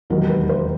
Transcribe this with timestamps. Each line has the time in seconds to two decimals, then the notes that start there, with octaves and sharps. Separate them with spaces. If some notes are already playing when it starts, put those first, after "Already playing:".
0.10 E1 D#2 D#3 F#3 A#4
0.29 B4
0.49 C5